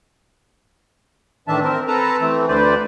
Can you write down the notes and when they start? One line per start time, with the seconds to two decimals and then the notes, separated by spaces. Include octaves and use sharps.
1.48 A2 D#3 E3 D4 E5 A5
1.63 C4 A#4
1.88 C4 A4 B4 A5 A#5
2.21 E3 A3 C4
2.48 D2 D3 B4 C5 D5